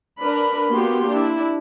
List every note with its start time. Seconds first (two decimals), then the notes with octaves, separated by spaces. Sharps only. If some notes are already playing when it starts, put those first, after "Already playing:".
0.21 D4 A#4 B4 B5
0.70 A#3 B3 F#4 G4 C6
1.10 D4 E4